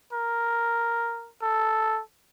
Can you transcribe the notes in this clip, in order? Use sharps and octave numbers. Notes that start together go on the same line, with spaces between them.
A#4
A4